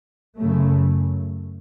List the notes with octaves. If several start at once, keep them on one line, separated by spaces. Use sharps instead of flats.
F#2 C#3 A3